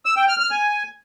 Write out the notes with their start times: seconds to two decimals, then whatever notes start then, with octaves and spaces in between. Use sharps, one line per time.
0.05 E6
0.17 G5
0.28 F6
0.39 F6
0.50 G#5